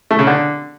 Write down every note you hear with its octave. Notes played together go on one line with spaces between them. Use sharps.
A3
C#3
D3